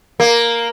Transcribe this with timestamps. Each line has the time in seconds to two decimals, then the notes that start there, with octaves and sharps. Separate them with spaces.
0.20 A#3